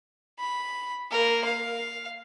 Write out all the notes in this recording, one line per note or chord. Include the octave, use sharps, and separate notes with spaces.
B5
A#3 A#4
F5